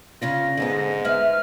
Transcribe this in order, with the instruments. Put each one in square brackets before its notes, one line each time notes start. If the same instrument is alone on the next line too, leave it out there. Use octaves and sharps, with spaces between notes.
[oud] C#3 C#4 D4 [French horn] F4 [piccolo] A#6
[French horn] G#2 [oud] D3 G#3 B3
[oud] G#3 B4 E5 [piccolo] F6